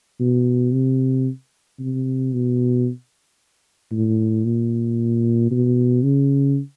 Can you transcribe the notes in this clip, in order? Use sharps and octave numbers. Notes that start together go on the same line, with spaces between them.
B2
C3
C3
B2
A2
A#2
B2
C#3